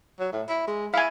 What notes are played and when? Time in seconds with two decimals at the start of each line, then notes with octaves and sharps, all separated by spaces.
0.20 F#3
0.33 A2
0.49 E4
0.68 G#3
0.94 E4 F5 G#5